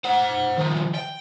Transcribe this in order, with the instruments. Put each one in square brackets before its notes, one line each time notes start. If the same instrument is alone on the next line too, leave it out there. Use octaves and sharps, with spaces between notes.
[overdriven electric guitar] C5 F#5
D#3 F3
G5